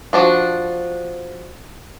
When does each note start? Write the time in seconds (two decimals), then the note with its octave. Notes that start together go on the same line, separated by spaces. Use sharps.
0.13 F3 D4 F#4